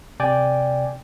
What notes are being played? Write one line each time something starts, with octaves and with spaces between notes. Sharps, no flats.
C3 D5 G5 G#5